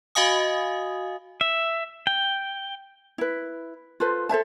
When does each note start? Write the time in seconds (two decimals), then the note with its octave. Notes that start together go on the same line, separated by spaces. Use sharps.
0.15 F#4 D#5 F5 G#5 D#6
1.41 E5
2.07 G5
3.18 E4 B4
4.00 F4 A4 B4 C5
4.29 A4 C5 E5 A5